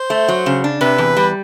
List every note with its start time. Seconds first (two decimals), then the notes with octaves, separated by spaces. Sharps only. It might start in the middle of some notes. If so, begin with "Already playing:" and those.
Already playing: C5
0.10 A3
0.28 F#3
0.46 C#3
0.64 D4
0.81 C3 B4
0.98 E2
1.17 G3